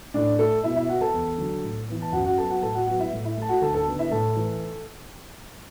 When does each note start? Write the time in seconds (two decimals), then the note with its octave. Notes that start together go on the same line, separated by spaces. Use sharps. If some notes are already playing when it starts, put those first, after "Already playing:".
0.14 A2 D4 D5
0.39 A3 A4
0.63 B2 E4 E5
0.76 E4 E5
0.89 B3 F#4 F#5
1.01 A4 A5
1.13 E2
1.38 D3 F#3
1.64 A2
1.89 E3 B3
2.02 A5
2.12 F#2 F#4 F#5
2.25 F#4 F#5
2.37 F#3 B3 A4 A5
2.50 F#4 F#5
2.62 A2 A4 A5
2.75 F#4 F#5
2.87 F#3 B3 F#4 F#5
3.00 E4 E5
3.12 A2
3.24 E4 E5
3.37 A3 A5
3.49 F#4 F#5
3.62 D2 A4 A5
3.74 A4 A5
3.86 B3
3.91 D3
3.99 E4 E5
4.11 A2 A4 A5
4.36 E3 A3